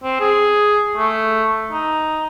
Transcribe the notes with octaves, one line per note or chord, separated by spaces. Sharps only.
C4
G#4
A3
D#4